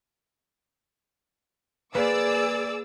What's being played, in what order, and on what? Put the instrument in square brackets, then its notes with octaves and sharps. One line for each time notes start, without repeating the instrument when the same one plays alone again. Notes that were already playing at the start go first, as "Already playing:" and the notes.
[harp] A#3 B4 [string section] G#4 D6 E6 [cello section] D5